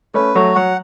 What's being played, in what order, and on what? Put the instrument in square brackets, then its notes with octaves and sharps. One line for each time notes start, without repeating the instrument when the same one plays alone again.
[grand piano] A3 C#4 [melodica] B4
[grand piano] F#3 A3 [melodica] F#4
[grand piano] F#3 [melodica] F#5